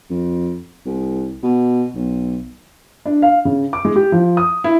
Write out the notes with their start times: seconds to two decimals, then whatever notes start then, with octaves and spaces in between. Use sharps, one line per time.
0.10 F2
0.86 C2
1.43 B2
1.95 B1
3.06 D4
3.22 F5
3.45 C#3
3.73 D6
3.85 G#3
3.96 G4
4.12 F3
4.37 D#6
4.64 E4